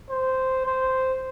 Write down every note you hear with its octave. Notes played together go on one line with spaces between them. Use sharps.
C5
C5